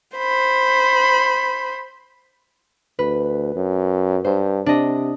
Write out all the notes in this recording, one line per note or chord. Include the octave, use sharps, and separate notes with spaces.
C5 B5
D2 B4
F#2
G2 C5
C3 D4 D#5